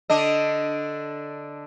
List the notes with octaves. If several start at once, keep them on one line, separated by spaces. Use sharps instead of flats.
D3 D4 D#5